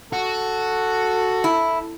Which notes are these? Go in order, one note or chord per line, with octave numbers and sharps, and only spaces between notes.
F#4 A4
E4